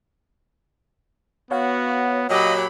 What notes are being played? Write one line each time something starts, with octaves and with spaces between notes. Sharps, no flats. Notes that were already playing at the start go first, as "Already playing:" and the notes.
B3 F#4 C#5 F5 F#5
A#2 F#3 G4 D#5 B5